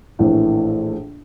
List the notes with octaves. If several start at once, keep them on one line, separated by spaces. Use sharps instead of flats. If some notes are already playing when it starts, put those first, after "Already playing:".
A#1 A2 E3